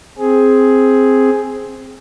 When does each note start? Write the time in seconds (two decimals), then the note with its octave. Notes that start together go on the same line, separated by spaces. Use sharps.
0.19 C4 G#4